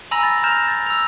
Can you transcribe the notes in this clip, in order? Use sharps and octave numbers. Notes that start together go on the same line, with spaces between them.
G#5 A#5 B5 E6 A#6
A6
A#5 F6 G6 A#6 E7 F7
A6
E6 F7